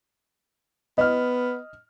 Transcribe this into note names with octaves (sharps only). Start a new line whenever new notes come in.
B3 D#5 F6